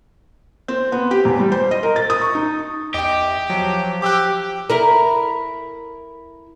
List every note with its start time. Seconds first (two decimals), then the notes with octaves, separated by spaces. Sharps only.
0.68 C4
0.92 B3
1.11 G4
1.25 E2
1.40 G3
1.52 C5
1.71 D#5
1.83 A#4
1.96 A6
2.10 D#6
2.21 C#6
2.35 D#4
2.94 E2 G4 D#5 G5
3.50 F3 F#3
4.02 G4 D6 E6 F#6
4.70 E4 A#4